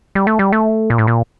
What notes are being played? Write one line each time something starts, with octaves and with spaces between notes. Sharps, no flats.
G3
A3
G3
A3
A#2
A2
A#2